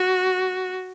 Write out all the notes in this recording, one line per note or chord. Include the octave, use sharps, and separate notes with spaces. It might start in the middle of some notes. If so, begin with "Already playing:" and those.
Already playing: F#4